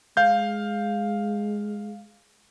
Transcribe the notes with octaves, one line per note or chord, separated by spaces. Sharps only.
G#3 F5 G6